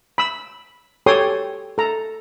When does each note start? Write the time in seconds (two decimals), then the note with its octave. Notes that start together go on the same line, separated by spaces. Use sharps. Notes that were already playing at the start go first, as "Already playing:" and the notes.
0.18 B5 E6
1.06 G4 A4 C#5 G5 C6 D#6
1.78 A4 A#5